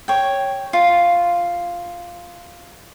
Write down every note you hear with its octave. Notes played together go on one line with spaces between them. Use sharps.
C#5 G5
F4